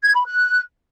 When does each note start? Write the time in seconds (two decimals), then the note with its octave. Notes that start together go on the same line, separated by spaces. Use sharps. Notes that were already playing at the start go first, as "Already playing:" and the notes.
0.04 G#6
0.15 B5
0.25 F#6